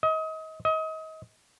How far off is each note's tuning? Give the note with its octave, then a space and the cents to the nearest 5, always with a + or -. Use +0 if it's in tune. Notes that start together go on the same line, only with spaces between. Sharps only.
D#5 +30
D#5 +30